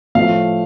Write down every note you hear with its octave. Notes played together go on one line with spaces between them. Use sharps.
A2 F3 A3 F5